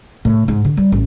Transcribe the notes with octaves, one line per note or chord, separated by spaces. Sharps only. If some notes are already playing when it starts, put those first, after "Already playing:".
A2
G#2
D3
G3
A1